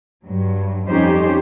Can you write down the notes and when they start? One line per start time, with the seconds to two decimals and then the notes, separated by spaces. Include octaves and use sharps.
0.25 G2 F#3
0.89 F2 G3 C#4 D#4 G4 C5